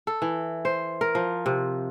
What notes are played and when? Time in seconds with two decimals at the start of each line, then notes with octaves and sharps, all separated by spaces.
0.07 A4
0.22 E3
0.65 C5
1.01 A#4
1.15 F3
1.46 C3